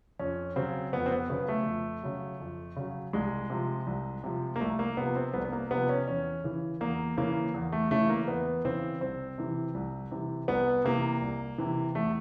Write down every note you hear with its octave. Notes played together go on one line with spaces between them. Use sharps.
F2 C#4
C#3 F#3 C4
F2 B3
C4
B3
C#3 F#3 B3
A3
F2
C#3 F#3
F2
C#3 F#3
C2 G#3
C3 F3
C2
C3 F3
A#3
C2 A3
A#3
C3 F3 B3
C4
C2 B3
B3
A#3
C3 F3 B3
C#4
E2 C#4
C#3 E3
E2 A#3
C#3 E3 A#3
E2
A3
C#3 E3 A3
A#3
E2 B3
C#3 E3 C4
C2 C4
C3 E3
C2
C3 E3
C2 B3
C3 E3 A#3
C2
C3 E3
E2 A3